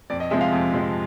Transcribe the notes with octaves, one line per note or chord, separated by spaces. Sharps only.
F2 D5
D#5
C3 F3 G#3 E5
F5
F2
C3 F3 G#3